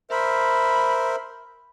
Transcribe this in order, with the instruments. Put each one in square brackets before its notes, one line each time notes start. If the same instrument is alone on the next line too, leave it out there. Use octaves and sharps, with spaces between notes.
[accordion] A#4 C5 E5 [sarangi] B5